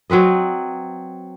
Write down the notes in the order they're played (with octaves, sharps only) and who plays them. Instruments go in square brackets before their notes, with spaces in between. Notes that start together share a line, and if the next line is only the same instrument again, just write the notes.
[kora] F#3 C4 B4 D#5